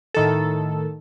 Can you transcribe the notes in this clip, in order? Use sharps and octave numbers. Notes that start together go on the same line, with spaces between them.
A2 D#3 A4